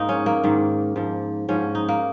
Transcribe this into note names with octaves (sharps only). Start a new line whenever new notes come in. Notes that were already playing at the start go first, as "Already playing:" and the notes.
Already playing: G#2 A#3 D#4
C#4
A#3
G#2 D#3
G#2 F3
G#2 F3 C#4
D#4
A#3